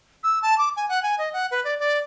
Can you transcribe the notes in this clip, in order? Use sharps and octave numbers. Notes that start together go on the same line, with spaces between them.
E6
A5
D6
G#5
F#5
G#5
D#5
F#5
B4
D5
D5